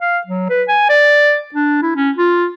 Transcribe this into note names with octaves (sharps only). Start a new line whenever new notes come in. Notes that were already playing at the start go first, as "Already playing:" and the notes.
F5
F#3
B4
G#5
D5
D4
E4
C#4
F4